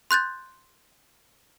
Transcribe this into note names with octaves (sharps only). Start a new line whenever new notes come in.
C6 F#6 G6 A6